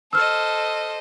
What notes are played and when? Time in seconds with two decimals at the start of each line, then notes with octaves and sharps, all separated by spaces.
0.13 A4 C5 D#5 E6 F6